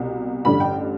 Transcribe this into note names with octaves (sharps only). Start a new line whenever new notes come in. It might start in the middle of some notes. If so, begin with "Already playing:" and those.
Already playing: C2 B2
A1 G2 D3 B5
G5